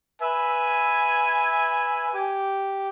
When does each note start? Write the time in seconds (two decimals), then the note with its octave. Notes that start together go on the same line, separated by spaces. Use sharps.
0.21 B4 E5 G#5
2.14 G4